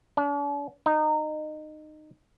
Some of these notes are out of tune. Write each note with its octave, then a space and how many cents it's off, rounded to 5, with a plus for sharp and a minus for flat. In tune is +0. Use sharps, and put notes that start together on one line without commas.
D4 -45
D#4 -20